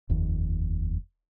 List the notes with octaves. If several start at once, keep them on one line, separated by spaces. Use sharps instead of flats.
F1 D#2